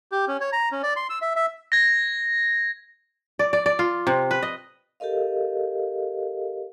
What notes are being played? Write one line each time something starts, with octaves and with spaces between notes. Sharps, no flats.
G4
C#4
C#5
A#5
C#4
D5
C6
E6
E5
E5
G#6 A#6
D5
D5
D5
F4
C3
B4
D#5
G4 A4 A#4 D#5 F5